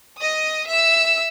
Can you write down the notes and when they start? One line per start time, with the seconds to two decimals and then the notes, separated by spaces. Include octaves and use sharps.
0.17 D#5 D#6
0.67 E5 E6